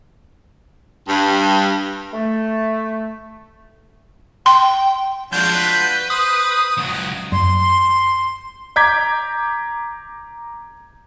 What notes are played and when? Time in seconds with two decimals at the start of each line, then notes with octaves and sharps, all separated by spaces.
1.07 G2
2.14 A3
4.46 G5 C6
5.33 F2 G#3 D4 F4 F#4 G6
5.52 B4
6.10 C5 D#6
6.77 C#2 F#3 F#4
7.32 F#2 C6
8.76 A#5 D6 G6 G#6 B6